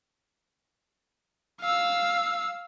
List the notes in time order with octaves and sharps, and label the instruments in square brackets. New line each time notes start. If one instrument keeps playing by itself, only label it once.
[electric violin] F5 E6